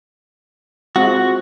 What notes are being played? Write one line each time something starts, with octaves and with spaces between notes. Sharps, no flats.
G#3 C4 F4 F#4